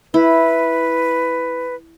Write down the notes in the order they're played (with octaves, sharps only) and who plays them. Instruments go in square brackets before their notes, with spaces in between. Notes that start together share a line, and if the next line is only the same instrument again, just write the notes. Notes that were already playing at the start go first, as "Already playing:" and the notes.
[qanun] E4 [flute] B4